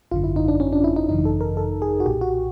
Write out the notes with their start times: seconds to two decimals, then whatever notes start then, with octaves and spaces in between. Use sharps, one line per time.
0.11 G#1 F#2 D3 F4
0.24 E4
0.36 D#4
0.48 D4
0.60 C#4
0.73 D4
0.84 E4
0.96 D#4
1.09 G#1 F#2 C#3 E3 D#4
1.25 A4
1.41 A#4
1.57 A4
1.82 G#4
2.00 F#4
2.06 B1 A#2 G4
2.21 F#4